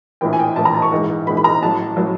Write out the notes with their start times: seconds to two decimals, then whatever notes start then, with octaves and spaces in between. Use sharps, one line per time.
0.21 A#1 A2 E3 G5
0.33 G#5
0.39 G5
0.56 A#1 A2 E3 A5
0.65 A#5
0.74 A5
0.82 C#6
0.92 A#1 G#2 E3
1.27 A#1 G#2 E3 B5
1.37 B5
1.44 A#5
1.61 A1 A2 F#3 A5
1.97 A2 F#3